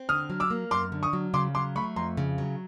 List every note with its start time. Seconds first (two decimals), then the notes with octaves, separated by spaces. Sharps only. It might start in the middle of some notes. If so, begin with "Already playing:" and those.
Already playing: C4
0.09 D3 D#6 F6
0.30 F#3
0.40 D6 E6
0.50 A#3
0.71 F#2 C6 D6
0.92 D3
1.03 C#6 D#6
1.13 F#3
1.34 C#3 C6 D6
1.55 F#3 C6 D6
1.76 A3 B5 C#6
1.96 F2 A#5 C6
2.17 C#3
2.38 F#3